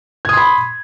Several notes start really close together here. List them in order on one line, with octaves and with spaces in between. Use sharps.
G#6 D#6 C6 B5